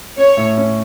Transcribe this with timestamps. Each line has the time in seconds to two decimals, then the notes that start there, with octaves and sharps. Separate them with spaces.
0.17 C#4 C#5
0.37 A2
0.57 C#4